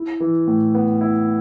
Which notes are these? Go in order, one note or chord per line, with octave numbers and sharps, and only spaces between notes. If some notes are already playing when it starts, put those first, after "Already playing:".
Already playing: E4
E3
A2
B3
E4